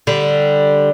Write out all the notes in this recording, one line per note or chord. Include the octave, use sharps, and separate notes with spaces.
D3 G3